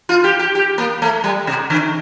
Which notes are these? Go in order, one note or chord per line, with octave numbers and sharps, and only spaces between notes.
F4
G4
G4
G4
A#3
A3
G3
C3
D3